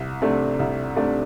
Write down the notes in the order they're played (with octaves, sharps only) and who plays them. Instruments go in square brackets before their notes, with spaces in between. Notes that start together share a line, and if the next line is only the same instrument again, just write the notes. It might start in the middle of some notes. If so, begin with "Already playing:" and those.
Already playing: [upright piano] C2
C3 A3 D4
C2
C3 A3 D4